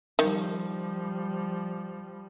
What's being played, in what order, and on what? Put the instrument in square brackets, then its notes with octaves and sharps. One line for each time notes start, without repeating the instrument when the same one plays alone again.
[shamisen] D#3 [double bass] F3 G3